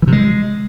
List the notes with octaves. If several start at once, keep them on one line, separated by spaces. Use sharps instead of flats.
E3
C3
G#3